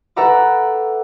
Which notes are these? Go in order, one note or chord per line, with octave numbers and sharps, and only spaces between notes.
A4 B4 E5 F#5 A#5 D6